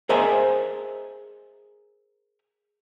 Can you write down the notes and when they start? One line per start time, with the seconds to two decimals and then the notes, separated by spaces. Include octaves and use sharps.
0.09 G#4 A#4 C5 D#5 E5 G#5